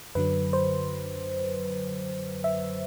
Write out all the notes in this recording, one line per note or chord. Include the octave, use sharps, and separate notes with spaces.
F#2 D3 F#3 B4
C5
E5